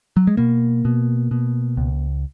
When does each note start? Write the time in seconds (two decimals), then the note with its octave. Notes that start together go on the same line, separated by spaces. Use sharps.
0.17 F#3
0.27 G#3
0.37 B2 A#3
0.85 B2
1.31 B2
1.77 C#2